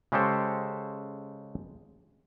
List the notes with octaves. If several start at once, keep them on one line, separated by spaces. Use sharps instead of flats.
C#3 G#3 G4 A4 C5